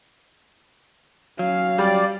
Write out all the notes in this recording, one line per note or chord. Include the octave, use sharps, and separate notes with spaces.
F#3 C#4 F5
G3 D5 G5